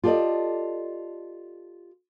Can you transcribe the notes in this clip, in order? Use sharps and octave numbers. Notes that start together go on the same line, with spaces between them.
F4 G4 A4 B4 D5 D#5